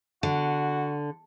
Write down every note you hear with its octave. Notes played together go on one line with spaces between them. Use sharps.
D3 F#4